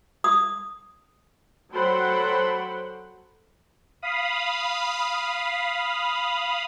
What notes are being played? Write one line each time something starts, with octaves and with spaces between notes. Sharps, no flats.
D#6
F#3 A4 C5 F#5 G5 B5
F5 B5 D#6